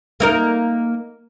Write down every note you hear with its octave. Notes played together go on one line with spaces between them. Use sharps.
A#3 D#4 A#4